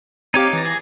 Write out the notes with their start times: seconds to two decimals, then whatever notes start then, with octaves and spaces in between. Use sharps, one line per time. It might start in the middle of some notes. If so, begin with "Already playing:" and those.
0.34 C4 D#4 G4 C#5 F5 D6
0.53 E3 A6 A#6
0.65 G#4